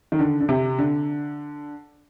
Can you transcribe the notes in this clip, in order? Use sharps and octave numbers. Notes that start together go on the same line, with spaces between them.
D#3
D3
D3
C3
D3